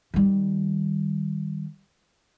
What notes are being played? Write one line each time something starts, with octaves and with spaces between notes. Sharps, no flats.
D#3 G3